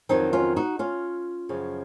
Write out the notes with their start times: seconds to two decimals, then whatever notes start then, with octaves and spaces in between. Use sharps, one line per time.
0.09 F2 D#3 F#3 C4 D#4
0.33 C#4 F4
0.56 D#4 F#4
0.79 C#4 F4
1.49 F#2 C#3 F3